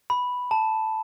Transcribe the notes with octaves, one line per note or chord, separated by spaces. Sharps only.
B5
A5